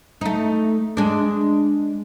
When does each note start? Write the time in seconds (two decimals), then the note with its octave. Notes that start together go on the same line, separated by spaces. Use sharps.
0.21 A3 D#4
0.97 G#3 D4